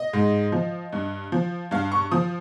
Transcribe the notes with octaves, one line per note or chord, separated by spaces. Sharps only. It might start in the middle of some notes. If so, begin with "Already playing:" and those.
Already playing: D#5
G#2
F3
G2
F3
G2 F5
C#6
F3 D#6